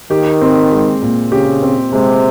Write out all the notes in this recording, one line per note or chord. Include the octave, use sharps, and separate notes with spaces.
D#3 G4
C4
G#3
A#2
C#3 G4
C4
C3 G#3